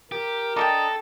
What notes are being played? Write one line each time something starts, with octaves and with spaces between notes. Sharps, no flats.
G4 A#4
D4 A4 D#5 G5 A5 A#5 D6